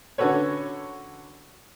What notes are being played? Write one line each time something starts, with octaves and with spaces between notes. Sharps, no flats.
D3 C#4 F#4 A4 B4 C#5